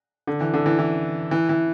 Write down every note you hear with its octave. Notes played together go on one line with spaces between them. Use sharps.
D3
E3
D3
E3
E3
E3
E3